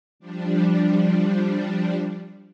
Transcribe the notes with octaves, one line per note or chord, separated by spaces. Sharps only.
F3 G3 D4